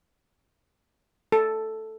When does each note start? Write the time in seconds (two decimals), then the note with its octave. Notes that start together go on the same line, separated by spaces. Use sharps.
1.32 A4